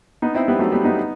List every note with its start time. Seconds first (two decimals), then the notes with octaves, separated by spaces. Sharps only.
0.22 B3 D#4
0.35 C4 E4
0.48 G3 B3
0.59 F#3 A3
0.72 G3 B3
0.84 B3 D#4